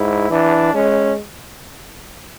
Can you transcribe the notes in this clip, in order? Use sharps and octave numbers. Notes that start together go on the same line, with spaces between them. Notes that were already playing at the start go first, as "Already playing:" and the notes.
Already playing: G#2 E4
E3 D4
G#3 C#4